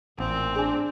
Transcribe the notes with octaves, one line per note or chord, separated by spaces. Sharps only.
A1 A#2 C4
D4 G#4 G#5